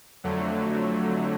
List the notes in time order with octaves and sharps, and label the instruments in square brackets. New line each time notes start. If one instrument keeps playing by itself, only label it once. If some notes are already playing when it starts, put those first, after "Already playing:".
[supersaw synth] F2 D3 F#3 A3